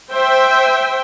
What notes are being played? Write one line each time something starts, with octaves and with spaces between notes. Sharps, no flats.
C5 E5 G5